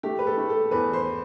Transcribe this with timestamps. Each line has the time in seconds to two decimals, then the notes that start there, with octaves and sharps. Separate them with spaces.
0.03 A3 G4
0.19 B4
0.27 A4
0.37 A3
0.49 A4
0.71 E2 B4
0.93 C5